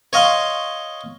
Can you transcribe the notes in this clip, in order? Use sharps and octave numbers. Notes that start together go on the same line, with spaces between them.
C#5 D#5 F5 C6